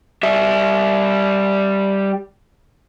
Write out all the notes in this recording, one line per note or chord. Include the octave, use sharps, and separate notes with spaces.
G3 E5